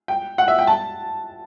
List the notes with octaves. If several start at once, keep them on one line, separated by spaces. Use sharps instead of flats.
G5
F#5
E5
G5
A5